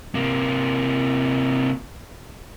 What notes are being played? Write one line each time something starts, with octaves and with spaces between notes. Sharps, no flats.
C3 A#3